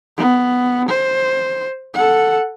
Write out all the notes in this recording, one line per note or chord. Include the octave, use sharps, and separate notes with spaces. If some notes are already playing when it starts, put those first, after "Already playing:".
B3
C5
A4 F#5